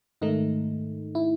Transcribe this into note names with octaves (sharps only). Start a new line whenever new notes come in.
G#2 D#3 A3 D#4
E4